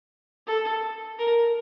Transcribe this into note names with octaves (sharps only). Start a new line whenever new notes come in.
A4
A#4